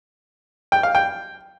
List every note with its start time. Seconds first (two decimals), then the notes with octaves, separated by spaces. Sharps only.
0.72 G5
0.83 F5
0.95 G5